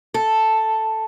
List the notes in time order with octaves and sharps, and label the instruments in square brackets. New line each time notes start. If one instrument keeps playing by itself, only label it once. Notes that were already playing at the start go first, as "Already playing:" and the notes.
[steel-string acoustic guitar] A4